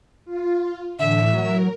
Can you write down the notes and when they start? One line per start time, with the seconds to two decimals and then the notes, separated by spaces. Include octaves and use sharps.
0.25 F4
0.99 A2 D3 E3 E5
1.33 F#3 A#4